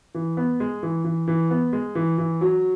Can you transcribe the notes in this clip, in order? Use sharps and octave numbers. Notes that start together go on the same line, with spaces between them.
E3
B3
G#3
E3
E3
E3
B3
G#3
E3
E3
F#3